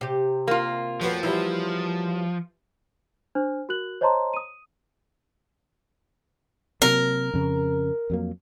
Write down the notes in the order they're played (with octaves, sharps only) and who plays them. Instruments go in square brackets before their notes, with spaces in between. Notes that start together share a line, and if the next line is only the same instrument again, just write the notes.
[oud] C3 G4
[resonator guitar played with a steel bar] A#3 F4
[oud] F2 B3 [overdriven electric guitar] F3 [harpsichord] F#4 B4 C#5
[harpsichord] E3 G3 [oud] F#3 E4
[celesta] D4 C5 F6
F#4 A#4 F#6 F#7
C5 C#5 D#5 A5 A#5 C6
D#6 D#7
[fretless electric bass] C3 F#3 A#3 [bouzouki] A#4
[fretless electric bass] F2 C#3
F2 F#3 A#3